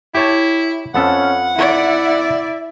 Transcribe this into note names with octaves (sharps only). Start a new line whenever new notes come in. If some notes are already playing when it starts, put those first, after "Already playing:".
E4 G4 C#5 A5
F2 B3 C#4 A4 F#5
E4 D5 E5